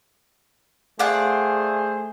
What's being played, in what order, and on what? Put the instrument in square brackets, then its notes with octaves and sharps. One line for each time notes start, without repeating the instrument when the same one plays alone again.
[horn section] A3 G#4 C5 [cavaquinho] D5 F5 F#5